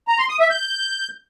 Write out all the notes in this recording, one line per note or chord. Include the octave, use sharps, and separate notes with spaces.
A#5
C6
D#6
E5
G6